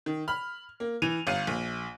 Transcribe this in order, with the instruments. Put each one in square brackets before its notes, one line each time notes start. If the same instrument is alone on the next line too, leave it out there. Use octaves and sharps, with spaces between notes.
[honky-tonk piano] D#3
B5 F6
A#3
E3 D#7 F7
G1 F5 D#7
A#1